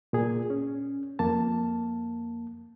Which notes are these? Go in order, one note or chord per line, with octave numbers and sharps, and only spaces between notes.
A#2 G#4
C#4
F2 A#3 A5